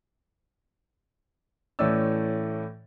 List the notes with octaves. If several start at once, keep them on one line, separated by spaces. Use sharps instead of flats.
A2 E3 A3 C#4 D5 E6